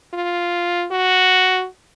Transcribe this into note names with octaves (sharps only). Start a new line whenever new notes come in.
F4
F#4